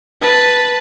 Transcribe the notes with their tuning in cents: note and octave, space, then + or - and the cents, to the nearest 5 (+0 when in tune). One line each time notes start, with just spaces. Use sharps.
B4 +0 A5 +0